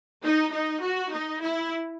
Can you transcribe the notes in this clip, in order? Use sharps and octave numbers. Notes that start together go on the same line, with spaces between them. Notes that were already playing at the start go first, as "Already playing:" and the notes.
D#4
D#4
F#4
D#4
E4